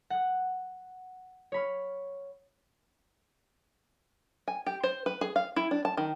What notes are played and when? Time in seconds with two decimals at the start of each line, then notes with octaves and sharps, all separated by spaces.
0.10 F#5 F#6
1.52 C#5 B5 F6
4.48 G#5
4.67 G4
4.83 C5
5.06 B4
5.21 G#4
5.36 F5
5.56 E4
5.71 D4
5.85 A5
5.97 D#3